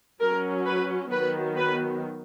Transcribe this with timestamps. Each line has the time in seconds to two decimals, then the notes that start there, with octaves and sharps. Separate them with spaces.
0.20 F#3 C#4 A#4
0.65 B4
1.11 D#3 F#3 B3 B4
1.56 B4